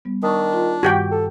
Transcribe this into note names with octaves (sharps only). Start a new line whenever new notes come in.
G3 B3
D#3 D4 C#6 D#6
F4 C6
G2 D#3 G3 F#4 G4 G5
A4